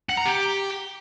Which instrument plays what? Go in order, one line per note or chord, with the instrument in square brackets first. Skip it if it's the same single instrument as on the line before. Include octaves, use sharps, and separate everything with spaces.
[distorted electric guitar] F#5
A#5
G4